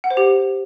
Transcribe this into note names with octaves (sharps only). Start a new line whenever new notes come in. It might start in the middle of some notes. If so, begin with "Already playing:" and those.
F#5
C5
G4